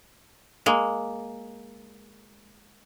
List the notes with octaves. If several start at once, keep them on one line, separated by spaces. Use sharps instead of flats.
G#3 A#3